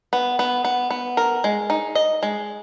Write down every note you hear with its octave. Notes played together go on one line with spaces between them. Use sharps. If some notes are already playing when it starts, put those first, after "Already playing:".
B3
B3
B3
B3
A#4
G#3
D#4
D#5
G#3